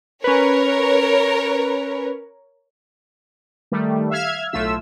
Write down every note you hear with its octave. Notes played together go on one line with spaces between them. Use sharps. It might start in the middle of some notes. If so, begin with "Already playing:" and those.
C#4 A#4 B4 C#5
D#3 G3 A3
E5 F5 E6 F6 G#6
B1 A2 A3 F4 E5 E6